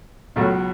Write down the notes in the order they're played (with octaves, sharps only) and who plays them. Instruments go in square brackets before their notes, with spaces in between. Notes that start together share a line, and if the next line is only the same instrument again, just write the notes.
[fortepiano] C#2 B2 F#3 A3